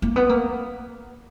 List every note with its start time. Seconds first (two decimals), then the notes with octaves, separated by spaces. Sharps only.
0.02 A#3
0.16 B3
0.29 A#3